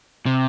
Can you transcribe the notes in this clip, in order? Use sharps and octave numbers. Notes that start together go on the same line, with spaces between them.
C3